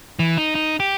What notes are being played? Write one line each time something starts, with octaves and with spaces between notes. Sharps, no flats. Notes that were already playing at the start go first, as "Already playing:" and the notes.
E3
D#4
D#4
G4